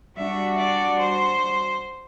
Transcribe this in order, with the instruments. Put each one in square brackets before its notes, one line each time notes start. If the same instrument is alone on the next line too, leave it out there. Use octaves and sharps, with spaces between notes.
[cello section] G3 D4 F#4 [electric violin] E5
[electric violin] D5
C5